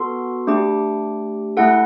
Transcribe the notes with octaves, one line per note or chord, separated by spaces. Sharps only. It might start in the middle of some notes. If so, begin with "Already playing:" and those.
Already playing: B3 F#4 A4 C6
A3 D4 G4 D6
A3 E4 A4 F#5